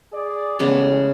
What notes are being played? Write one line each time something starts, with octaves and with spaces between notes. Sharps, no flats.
G#4 D5
A1 C#3 G#3 B3